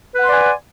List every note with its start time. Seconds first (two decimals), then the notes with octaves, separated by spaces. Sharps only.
0.15 B4
0.19 F#5
0.23 C6
0.28 D5
0.32 G#5